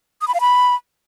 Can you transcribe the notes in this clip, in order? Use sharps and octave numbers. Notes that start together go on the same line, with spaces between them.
D#6
B5
F5
B5